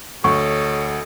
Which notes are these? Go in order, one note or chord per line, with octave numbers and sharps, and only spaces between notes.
D2 A4 C#5 D#5 C#6